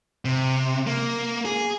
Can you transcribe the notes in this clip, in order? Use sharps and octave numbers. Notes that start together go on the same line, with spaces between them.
C3
A#3
G#4